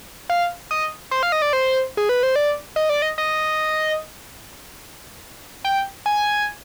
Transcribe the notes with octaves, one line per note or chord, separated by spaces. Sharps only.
F5
D#5
C5
F5
D#5
D5
C5
G#4
B4
C5
D5
D#5
D5
D#5
D#5
G5
G#5